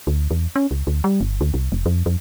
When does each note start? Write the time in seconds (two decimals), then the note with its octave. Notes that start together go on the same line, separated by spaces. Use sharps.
0.07 D2
0.31 E2
0.56 C#4
0.71 C#2
0.87 D2
1.04 G3
1.21 G1
1.41 D2
1.54 C2
1.72 F1
1.86 F2
2.06 F2